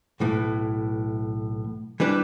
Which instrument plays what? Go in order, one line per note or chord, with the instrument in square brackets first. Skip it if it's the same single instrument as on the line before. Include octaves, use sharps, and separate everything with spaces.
[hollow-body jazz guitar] B1 A2 E3
E3 G3 D4 B4